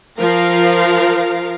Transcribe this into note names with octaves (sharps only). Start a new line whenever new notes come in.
F3 A#4 F5